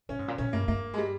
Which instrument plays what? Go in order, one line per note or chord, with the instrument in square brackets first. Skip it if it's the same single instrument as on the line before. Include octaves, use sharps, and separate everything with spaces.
[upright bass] A#2 [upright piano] C#4
[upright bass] G#2
A#2
[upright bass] A#2 [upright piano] C#4
[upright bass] G2 [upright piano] A#3
[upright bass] G2 [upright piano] A#3
[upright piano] G#3
G3